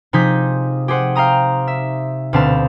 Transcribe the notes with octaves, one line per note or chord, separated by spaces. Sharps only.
C3 F3 D#4 G#4 G6 B6
G4 G#4 C5 F#5
F5 G5 A#5 D#6
E5
D2 B2 C4 B4 F5 A5